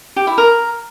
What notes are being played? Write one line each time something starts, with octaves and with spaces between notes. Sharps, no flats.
G4
E4
A#4